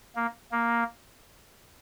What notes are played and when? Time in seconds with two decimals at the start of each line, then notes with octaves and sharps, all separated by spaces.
0.16 A#3
0.52 A#3